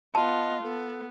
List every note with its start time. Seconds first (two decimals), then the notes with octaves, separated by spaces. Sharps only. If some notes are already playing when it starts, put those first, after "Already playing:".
0.15 B3 F4 D#5 A5
0.63 B3 A4